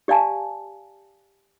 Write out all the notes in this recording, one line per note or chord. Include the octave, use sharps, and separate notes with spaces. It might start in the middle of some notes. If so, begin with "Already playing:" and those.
G4 D5 F5 G#5 A5